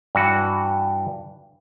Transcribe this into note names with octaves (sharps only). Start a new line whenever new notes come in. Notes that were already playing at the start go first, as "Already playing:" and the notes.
G2 E3 F#4